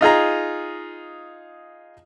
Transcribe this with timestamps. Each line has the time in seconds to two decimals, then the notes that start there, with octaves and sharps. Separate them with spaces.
0.01 D#4 F4 G#4 A#5